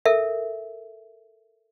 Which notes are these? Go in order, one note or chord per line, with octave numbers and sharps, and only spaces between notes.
A4 A#4 E5